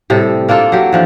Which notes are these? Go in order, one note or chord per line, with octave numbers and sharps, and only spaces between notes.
A2 C3 G3 A4
A#3 D4 F4 A4
F#3 G4
E3 F3 D4